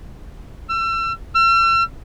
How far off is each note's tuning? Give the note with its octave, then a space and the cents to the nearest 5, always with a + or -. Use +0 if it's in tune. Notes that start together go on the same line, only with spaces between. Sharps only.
E6 +35
E6 +45